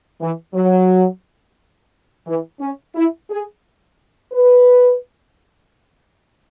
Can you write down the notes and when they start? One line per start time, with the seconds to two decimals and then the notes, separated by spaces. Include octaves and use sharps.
0.21 E3
0.54 F#3
2.27 E3
2.60 C#4
2.95 E4
3.30 G#4
4.32 B4